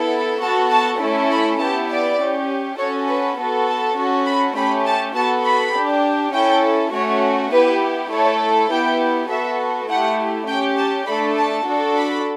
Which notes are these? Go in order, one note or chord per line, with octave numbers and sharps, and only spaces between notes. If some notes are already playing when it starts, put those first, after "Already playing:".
Already playing: B3 E4 A4
B3 F#4 A4 A5
A5
A3 C#4 E4 A4
B5
B3 E4 G4 A5
D5
C#4 G4
C#4 F#4 A4 C#5
B4
B3 F#4 A4
A5
C#4 F#4 A4
B5
A3 C#4 G4 B5
A5
B3 F#4 A4 A5
B5
D4 G4
C#4 E4 A4 G5
A3 C#4 F#4 C#5
B3 E4 G4 B4
A3 E4 A4 C#5
B3 E4 G4 G5
B3 F#4 A4 E5
A3 E4 G4 F#5
C#4 G4 G5
A5
A3 D4 A4 B5
A5
D4 F#4 A4
B5